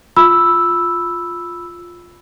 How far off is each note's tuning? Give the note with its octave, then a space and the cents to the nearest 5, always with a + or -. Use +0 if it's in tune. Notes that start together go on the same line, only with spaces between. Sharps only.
F4 +5 B5 +0 E6 +0